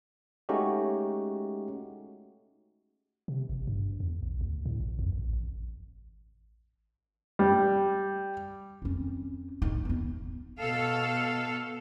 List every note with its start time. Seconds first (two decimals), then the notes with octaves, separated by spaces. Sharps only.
0.49 G#3 A3 C#4 D#4 F#4 G4
3.28 C3
3.49 G#1
3.67 G2
4.00 E2
4.23 A1
4.41 D2
4.66 A2
4.80 A1
4.99 F2
5.12 A1
5.33 A1
7.39 G3
8.82 F2 C#4
9.62 A2 D#4
9.85 E2 B3
10.61 B2 A4 F5